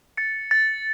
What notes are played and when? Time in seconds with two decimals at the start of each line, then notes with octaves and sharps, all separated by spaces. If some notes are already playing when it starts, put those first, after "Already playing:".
0.17 A6 C#7
0.51 A6